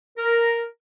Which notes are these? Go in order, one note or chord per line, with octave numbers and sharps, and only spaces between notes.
A#4